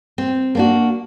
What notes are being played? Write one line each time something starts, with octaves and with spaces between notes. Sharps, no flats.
C4
A#3 D4 F#4